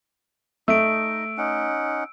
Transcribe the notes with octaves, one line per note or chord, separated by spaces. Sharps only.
A3 D#4 D#5 E6 D7
C#4 D#4 F#5